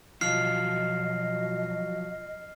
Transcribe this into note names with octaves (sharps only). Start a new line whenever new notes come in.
B2 F3 F#3 F4 D#5 F6 C7